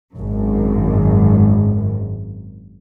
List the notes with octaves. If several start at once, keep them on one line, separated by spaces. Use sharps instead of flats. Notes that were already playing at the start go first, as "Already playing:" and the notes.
G#1 F#2